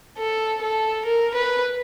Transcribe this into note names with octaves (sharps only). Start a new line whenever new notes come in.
A4
A4
A#4
B4